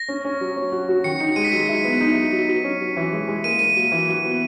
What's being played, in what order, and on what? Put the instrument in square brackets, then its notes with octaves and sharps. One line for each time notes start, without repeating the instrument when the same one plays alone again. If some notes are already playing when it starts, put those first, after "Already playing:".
Already playing: [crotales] A#6
[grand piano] C#4
C#4
F#3
C#4
F#4
F#4
[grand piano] D#3 [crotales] C#7
[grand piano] D#4 [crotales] C#7
[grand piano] G#3 [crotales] D#7
[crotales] B6
[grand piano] F#3 [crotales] C#7
[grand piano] E4
B3
D#4
F#3
F#3
F#3
C#4
F#3
E3
G#3
G#3
[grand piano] A#3 [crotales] D#7
[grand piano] A#3 [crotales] D#7
[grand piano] F#3
E3
F#4
B3